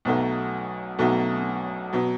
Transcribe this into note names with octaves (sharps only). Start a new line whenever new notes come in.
B1 B2 F#3 A3
B1 B2 F#3 A3
B2 F#3